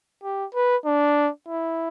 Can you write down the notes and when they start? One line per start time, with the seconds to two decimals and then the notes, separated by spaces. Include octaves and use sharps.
0.23 G4
0.54 B4
0.85 D4
1.49 E4